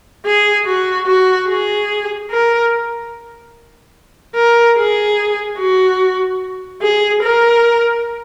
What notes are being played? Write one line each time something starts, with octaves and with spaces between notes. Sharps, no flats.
G#4
F#4
F#4
G#4
A#4
A#4
G#4
F#4
G#4
A#4